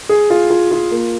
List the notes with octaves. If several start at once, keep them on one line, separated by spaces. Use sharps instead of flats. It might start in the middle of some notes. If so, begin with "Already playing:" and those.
G#4
F4
F4
F4
A#3